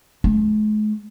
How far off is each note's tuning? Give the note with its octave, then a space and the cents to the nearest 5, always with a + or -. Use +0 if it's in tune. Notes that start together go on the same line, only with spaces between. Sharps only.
G#3 +45